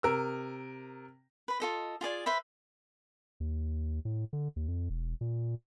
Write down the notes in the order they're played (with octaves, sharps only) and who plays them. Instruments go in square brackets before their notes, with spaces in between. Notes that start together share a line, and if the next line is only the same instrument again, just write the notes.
[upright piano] C3 A#4 E6
[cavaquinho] B4 B5
F4 A4 D#5
F4 G#4 D5 G#5
B4 C5 E5 B5
[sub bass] D#2
A2
D3
D#2
F2
E1
A#2